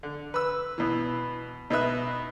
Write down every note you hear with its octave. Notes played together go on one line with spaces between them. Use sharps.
D3
B4 E6
B2 E3
B2 D#4 B4 E5 F#6